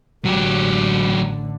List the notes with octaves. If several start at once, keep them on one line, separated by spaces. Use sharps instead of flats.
A1 D3 F#3 G4